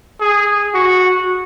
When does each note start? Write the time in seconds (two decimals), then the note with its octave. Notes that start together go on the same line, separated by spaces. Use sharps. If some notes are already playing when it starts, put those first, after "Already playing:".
0.21 G#4
0.74 F#4